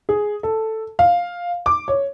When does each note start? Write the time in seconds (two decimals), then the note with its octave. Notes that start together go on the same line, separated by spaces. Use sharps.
0.09 G#4
0.43 A4
0.99 F5
1.66 D6
1.88 C#5